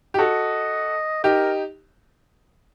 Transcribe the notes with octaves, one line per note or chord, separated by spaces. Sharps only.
G4
F#4 A4 D#5
D#4 G4 A#4